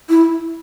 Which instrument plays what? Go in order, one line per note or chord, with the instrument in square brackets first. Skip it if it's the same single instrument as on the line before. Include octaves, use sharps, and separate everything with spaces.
[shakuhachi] E4